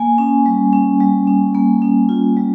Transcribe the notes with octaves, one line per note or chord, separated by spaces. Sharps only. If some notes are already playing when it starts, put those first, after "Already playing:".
Already playing: A#3 G#5
C#4
G3
C#4
G3
C#4
A#3
C#4
F4
G3